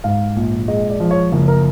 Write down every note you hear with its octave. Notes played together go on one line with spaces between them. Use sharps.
G#2 F5
A#1
G#3 D#5
D5
F3
C#5
F#1
A#4